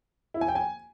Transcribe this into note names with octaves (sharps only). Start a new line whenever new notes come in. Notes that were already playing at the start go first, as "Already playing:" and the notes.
E4
G#5
G5
G#5